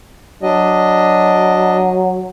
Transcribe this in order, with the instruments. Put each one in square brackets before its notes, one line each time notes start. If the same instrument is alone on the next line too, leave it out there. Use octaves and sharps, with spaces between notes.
[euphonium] F#3 [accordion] D4 D#5